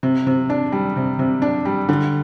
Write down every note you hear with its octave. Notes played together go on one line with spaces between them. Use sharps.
C3
C3
D4
G3
C3
C3
D4
G3
D3